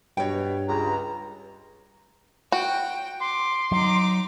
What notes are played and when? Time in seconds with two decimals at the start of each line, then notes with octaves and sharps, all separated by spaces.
0.17 G2 B2 C#5 G5
0.68 C#2 A#5
2.52 F#4 G5
3.21 C6 D6
3.72 F#3 D#4 D6